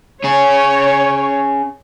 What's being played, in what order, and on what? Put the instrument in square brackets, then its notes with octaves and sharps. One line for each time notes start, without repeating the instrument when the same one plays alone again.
[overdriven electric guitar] C#4 G#4 [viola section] C#5